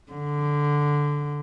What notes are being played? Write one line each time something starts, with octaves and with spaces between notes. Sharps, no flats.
D3